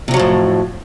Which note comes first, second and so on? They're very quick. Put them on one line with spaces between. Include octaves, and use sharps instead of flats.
C3 D#3 F#3 F2 A2